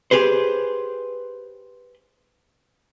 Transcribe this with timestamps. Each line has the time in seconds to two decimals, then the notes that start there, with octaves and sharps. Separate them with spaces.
0.11 G4 G#4 B4 C5